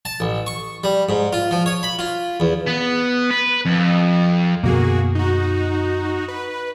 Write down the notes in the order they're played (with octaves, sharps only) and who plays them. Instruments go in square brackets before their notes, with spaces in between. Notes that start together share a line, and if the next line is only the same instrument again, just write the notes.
[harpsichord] A5
A1
C#6
G3
G#2
F4
F3
C#5
B5
F4
E2
[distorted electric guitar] B3
B4
F2
[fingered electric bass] F#2 B2 D3 [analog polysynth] A#3 F#4 G#4
[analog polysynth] D#4 F#4
B4